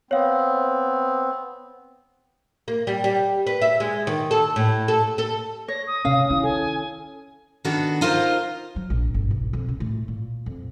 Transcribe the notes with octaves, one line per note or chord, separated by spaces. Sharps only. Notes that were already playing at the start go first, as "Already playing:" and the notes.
B3 C4 C#5 F5
A#3
G3
G3
B4
E5
G#3
D#3
A4
A2
A4
A4
C#5 A#6
D#6
C3 C#4 F5
D#3 C#4 E4
A4 G#5
D#3 B3 D4 F#4 A4
D#4 F4 A#4 C5 D5 D#5
F#3
A#1
G1
B1
F2
C#3
A2
A#2
F2